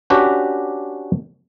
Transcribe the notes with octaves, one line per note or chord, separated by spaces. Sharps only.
C#4 D4 F#4 G4 B4